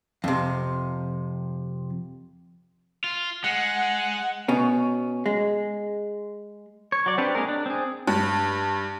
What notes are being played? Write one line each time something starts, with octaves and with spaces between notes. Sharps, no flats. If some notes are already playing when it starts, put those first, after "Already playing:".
F2 C3
F4
G#3 F#5
B2 C#4
G#3
C#5
F#3 D5
C4 D4 G4 B4 C#5
G#3 A#3 G#4 A#4
D4
C4 G#4
G2